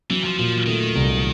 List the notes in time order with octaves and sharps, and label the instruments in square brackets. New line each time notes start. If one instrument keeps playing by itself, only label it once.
[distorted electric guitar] E3 [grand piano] F#3
[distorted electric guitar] F3
[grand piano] A#2 [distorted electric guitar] F3
[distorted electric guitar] D#3 [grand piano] A3
[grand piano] C2